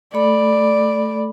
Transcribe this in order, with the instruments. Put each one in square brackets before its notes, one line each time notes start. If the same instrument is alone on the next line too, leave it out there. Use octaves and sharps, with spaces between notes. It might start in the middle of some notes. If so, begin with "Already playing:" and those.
[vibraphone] A3 A4 B5 [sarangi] D5